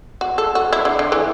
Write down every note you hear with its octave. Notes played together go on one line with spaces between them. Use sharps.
F#4
A4
F#4
E4
D3
D3
E3